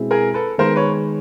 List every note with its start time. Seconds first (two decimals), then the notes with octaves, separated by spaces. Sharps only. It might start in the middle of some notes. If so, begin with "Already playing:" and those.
Already playing: B2 G#3 C4 E4
0.11 G#4 A#4
0.34 A4 B4
0.58 D#3 G#3 B3 A#4 C5
0.76 B4 C#5